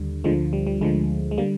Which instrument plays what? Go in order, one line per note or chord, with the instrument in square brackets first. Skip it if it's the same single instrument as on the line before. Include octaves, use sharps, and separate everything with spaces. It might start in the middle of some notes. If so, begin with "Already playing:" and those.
Already playing: [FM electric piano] D#2 D3 G3
D2 D3 F3 G#3
G3
G3
D2 D3 F3 G#3
G#3
D3 G3 A#3